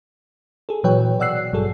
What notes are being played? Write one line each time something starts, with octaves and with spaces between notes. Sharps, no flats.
G#4 A4
A#2 E3 F#3 B4 C#5 G5
B2 D5 F#5 E6 F#6 C7
A1 G2 F#3 G3 G#4 A4